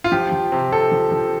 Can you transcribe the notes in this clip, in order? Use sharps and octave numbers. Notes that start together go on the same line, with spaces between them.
F4
F3 G4
F3
C3
C3 A4
F3
F3